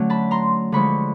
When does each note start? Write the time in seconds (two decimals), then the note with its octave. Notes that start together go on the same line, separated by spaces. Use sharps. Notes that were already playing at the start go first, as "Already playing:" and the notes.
Already playing: D3 F#3 A3 C#4
0.10 A5 B5
0.31 A#5 C6
0.72 D3 F3 G#3 B5 C#6